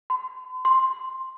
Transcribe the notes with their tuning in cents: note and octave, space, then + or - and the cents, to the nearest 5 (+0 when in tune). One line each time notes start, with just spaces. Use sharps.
C6 -45
C6 +5